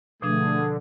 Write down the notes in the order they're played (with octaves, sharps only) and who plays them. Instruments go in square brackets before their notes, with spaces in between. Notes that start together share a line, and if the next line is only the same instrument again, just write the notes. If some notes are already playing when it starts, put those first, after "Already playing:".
[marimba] B2 F3 D4 [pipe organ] D3 [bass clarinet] A3 [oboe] G#4